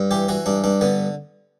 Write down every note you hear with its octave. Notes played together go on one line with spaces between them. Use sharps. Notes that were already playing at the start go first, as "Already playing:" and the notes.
Already playing: G2
E3 G4
E3 F#4
G2 D4
G2 D4
D3 B3